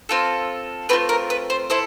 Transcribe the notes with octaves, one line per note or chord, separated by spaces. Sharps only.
C4 F4 A4
A3 C4 F4 B4
A#4
B4
C5
E4 A4 C5